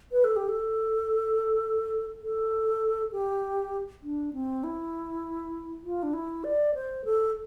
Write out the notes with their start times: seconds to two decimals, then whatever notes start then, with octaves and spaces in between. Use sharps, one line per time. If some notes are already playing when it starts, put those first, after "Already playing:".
0.12 B4
0.24 A4
0.36 G4
0.49 A4
2.22 A4
3.12 G4
4.03 D4
4.33 C4
4.64 E4
5.84 F4
6.03 D4
6.13 E4
6.44 D5
6.75 C5
7.05 A4